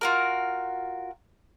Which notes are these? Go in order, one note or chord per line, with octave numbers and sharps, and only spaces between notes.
F4 F#4 A#4